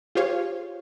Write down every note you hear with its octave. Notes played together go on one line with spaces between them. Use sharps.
F4 G4 G#4 C5 C#5 F5